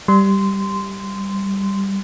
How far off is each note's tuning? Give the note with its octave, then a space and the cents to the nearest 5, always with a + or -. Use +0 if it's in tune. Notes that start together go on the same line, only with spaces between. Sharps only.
G3 +0 C6 -15